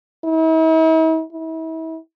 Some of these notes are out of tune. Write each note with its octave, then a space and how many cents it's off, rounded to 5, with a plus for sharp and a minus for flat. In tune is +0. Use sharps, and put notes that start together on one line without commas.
E4 -45
E4 -35